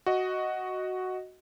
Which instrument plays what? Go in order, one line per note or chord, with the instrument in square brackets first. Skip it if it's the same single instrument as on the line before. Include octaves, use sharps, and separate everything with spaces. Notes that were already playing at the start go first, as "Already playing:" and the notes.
[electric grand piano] F#4 D#5